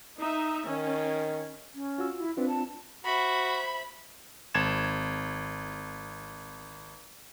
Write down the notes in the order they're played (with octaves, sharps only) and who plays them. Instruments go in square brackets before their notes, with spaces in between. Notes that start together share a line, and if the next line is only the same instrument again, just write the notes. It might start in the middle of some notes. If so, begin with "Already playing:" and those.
[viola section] D#4 E5
[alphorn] D#3 [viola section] C#4
[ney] C#4
[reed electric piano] F4 F#4 E6
[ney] E4
[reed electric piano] C4 D4 F4 [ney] B4
[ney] A5
[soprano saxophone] F#4 [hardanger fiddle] C5 E5 [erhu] B5
[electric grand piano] G#1 G#6 A6 E7